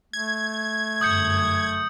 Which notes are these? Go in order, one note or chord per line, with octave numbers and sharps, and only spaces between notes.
A3 G#6
G1 F#2 D#6 G6 C#7